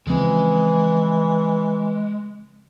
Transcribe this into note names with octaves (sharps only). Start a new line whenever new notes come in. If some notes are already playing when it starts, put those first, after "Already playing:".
C#3 E3 F3 G#3 C4